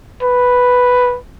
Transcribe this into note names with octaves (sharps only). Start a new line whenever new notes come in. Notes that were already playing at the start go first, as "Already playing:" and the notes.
B4